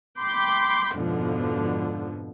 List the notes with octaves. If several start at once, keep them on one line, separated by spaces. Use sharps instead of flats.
G5 B5 C6 D6 G6
F2 G#2 B2 D3 F3